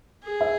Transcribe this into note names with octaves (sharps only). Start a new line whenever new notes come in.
G#4
E5